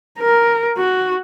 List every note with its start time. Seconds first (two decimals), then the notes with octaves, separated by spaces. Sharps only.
0.20 A#4
0.78 F#4